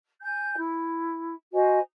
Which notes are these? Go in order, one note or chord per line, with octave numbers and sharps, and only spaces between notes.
G#5 G6
E4
F#4 C5 D#5 G#5